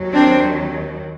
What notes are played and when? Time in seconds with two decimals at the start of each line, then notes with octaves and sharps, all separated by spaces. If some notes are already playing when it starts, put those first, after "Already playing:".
Already playing: D#2 D#3 F#3
0.13 C4 D4